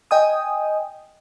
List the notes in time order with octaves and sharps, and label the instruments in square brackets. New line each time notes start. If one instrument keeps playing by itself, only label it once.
[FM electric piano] D#5 G5 G#5 D#6